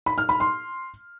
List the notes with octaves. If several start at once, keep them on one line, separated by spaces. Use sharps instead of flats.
B5
F6
B5
C6